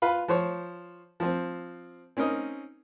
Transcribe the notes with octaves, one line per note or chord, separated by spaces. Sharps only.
F4 B4 F5 B5
F3 C5 C#5
F3 C4
C4 C#4 D#4 A#4 D#5